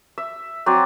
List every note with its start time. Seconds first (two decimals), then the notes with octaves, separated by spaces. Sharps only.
0.18 E5
0.66 F#3 C4 D5 G#5